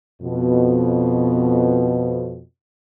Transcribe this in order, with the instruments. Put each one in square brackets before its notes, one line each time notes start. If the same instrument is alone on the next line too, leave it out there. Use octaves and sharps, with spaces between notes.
[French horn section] F2 B2